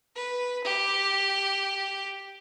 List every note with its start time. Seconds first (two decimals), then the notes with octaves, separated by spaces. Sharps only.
0.16 B4
0.64 G4